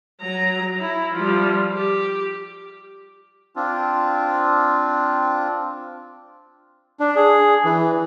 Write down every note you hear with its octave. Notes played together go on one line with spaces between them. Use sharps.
F#3 A#5
E4
F3 G3
G4
C4 D4 F4
D4
G#4
E3